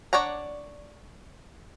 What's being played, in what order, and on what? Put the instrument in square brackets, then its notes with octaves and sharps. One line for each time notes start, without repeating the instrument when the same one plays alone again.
[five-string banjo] D4 C#5 D5 F#5 A#5